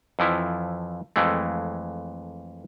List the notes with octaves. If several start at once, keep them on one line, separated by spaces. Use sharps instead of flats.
F2 E3 F3 E4
F2 E3 G#3 A3